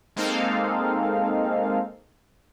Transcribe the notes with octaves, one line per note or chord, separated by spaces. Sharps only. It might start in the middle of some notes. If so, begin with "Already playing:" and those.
G#3 A#3 C4 D#4 A4 F5